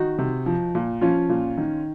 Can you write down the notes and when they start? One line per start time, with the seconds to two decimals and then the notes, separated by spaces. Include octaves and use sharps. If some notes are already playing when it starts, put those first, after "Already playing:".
Already playing: D#3 D#4 F#4
0.18 C3
0.46 F3
0.75 A#2
1.01 F3 C#4 F4
1.29 A#2
1.58 D#3